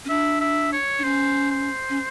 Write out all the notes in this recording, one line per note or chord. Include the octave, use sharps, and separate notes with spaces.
C#4
D4 E5
E5
C#5
D4
C#4 C5
C5
C#4